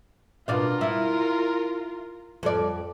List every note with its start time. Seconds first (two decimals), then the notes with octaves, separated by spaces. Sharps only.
0.48 B2 D4 F4 A#4 F5
0.81 E4
2.43 F2 D5